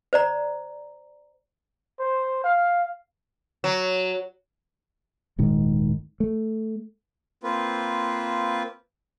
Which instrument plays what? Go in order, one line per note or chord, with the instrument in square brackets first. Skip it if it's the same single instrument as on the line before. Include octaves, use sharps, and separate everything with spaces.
[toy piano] C5 D5 A#5
[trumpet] C5
F5
[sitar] F#3
[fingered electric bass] D#1 G#2 D#3
A3
[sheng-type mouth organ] A#3 C4 F4 B4